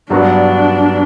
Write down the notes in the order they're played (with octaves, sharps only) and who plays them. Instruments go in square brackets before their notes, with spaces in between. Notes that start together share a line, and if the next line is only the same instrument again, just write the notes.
[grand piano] G2 F#3 B3 F#4 [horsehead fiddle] D4